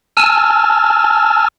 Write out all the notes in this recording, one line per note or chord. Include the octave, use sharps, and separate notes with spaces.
G#5 A5 E6 F6